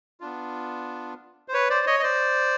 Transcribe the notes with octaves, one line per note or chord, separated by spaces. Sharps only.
B3 D4 F4
C5
B4 C#5
C5 D5
C#5 D#5
D#5
C5 D5